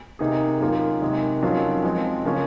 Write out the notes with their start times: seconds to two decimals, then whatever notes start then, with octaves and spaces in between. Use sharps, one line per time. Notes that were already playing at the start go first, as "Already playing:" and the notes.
0.19 C3 D#3 A#3 D#4 G#4
0.60 F#2 D#3 A#3 F4
1.01 C3 D#3 G#3
1.42 F2 D#3 F#3 C#4 F4
1.83 F3 G#3 C4
2.24 C#3 F3 A#3 C#4 F4